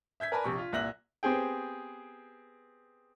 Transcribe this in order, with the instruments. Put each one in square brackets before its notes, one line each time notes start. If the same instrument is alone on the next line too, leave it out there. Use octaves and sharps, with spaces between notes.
[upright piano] E5 G6 G#6 B6
A#4 B4 D5 G#5 A5 B5
A#1 C3 C#6
F4
C2 A#2 E5 F#6 A#6 F#7
[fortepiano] B3 C4 G4 G#4 G5